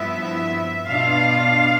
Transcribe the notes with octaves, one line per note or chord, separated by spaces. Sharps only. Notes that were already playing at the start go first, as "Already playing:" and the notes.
Already playing: G2 F3 B3 E4 E5
B2 B3 D4 F4 F5